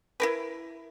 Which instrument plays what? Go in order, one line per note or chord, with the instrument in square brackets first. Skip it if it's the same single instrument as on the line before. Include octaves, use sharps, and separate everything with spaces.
[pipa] E4 A#4 B4